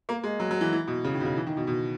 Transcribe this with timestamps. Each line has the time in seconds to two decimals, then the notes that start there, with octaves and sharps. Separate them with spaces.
0.09 A#3
0.24 G#3
0.40 F#3
0.51 F#3
0.61 E3
0.73 E3
0.87 B2
1.04 C#3
1.14 D#3
1.20 B2
1.25 C#3
1.36 E3
1.47 D#3
1.57 B2
1.67 B2